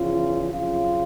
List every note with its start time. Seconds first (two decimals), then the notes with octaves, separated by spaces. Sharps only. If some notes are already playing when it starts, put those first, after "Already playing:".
Already playing: E2 C#3 F3 F4
0.49 F2 C#3 F#3 F4